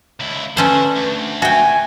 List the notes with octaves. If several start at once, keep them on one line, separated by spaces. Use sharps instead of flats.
C#2 E4
D3 A3 C#4 B4 C5
D2
F#4 E5 G5 G#5